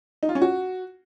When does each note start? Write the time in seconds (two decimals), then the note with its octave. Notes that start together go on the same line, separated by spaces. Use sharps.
0.23 D#4
0.29 F4
0.35 C#4
0.42 F#4